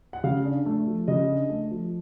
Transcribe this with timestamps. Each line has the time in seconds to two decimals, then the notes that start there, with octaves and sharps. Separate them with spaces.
0.13 F#5
0.24 C#3 F5
0.45 D4
0.66 A3
0.87 F3
1.08 C#3 D#5
1.29 D4
1.50 A3
1.71 F3